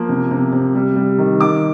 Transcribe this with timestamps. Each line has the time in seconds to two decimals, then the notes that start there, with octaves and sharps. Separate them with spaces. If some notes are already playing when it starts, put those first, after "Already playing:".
Already playing: F3 A#3
0.09 C3
0.31 C3
0.52 C3
0.75 G3
0.96 G3
1.18 D#3
1.41 D#3 D6